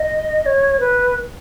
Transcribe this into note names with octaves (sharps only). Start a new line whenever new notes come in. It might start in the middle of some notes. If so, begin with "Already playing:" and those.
Already playing: D#5
C#5
B4